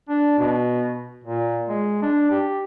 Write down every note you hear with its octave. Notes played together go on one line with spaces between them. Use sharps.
D4
B2
A#2
G#3
D4
G4